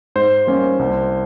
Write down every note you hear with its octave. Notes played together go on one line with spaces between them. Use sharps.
G#2 C5
G3 A#3 C#4
C2